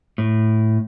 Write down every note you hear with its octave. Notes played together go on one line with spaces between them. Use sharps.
A2